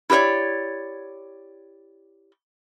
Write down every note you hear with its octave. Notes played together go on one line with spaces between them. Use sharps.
E4 G4 A#4 C#5 D5